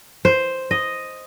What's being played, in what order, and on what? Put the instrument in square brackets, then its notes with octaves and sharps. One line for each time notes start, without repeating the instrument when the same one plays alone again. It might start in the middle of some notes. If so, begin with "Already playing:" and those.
[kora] C5
D#5